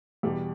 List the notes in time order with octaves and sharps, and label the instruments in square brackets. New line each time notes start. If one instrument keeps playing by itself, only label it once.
[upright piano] E2 B2 G3